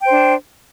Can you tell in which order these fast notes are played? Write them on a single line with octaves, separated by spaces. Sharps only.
G5 C5 D4